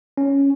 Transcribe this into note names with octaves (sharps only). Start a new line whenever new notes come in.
C#4